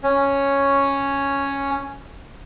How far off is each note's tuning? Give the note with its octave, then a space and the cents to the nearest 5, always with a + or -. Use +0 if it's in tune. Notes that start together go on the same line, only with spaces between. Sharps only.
C#4 +0 C#5 +0